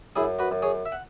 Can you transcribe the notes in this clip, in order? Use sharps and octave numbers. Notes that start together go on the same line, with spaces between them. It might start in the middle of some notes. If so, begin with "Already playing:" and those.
F#2 E4 G#4
F#4 B4
F#2
G#4 C#5
E5
F#5